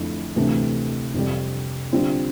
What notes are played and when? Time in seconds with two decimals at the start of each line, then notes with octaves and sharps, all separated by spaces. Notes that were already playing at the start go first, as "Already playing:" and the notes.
Already playing: F2 D3 F3 A3 E4
0.36 D2 C3 E3 A3
1.14 F2 C3 G3
1.92 D3 G3 C4 F4